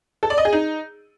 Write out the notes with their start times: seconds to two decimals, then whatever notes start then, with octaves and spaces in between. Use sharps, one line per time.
0.23 A4
0.30 D5
0.38 D#5
0.45 G#4
0.53 D#4